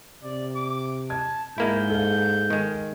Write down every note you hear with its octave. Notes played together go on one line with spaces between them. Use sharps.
C3 D5
D6
A5 G#6
G#2 G#3 A#3 E4 G6
A4 F5
D#3 G#3